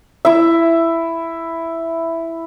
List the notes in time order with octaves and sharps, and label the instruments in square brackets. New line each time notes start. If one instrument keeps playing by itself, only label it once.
[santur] E4 E5